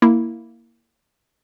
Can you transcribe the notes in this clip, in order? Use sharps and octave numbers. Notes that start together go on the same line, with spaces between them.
A#3 E4